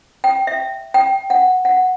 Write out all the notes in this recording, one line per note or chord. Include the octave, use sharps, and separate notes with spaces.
G5
E5
G5
F#5
F#5